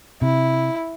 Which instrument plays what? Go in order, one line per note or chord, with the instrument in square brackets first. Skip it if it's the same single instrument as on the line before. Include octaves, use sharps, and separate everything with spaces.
[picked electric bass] C3 [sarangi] E4